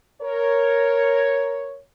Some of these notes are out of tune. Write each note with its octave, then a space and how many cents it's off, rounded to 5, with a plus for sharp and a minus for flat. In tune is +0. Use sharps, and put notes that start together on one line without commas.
A#4 +0 C#5 +0